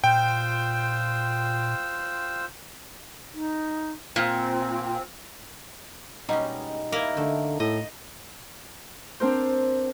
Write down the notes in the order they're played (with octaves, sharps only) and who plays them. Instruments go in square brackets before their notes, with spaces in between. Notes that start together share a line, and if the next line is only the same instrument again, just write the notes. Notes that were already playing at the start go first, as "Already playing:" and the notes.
[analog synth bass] A#2 [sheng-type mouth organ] F4 C5 E6 [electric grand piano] G5
[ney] D#4
[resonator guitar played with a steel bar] A#2 [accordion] C4
[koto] B2 [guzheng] G3 G#3 C#4 [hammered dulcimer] D#4
[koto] A#3 A#4 [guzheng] E4
[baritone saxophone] D3 [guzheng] A3
[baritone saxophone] A2 [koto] D#5
[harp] C4 D4 A#4 C5